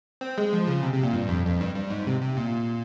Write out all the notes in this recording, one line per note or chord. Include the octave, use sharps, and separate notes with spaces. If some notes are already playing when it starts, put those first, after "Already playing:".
C4
G#3
F3
C#3
C3
C3
A#2
G2
F2
F2
G2
G2
G#2
C3
C3
A#2